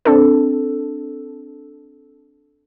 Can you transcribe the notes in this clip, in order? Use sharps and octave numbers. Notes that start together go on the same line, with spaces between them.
C4 D4 A4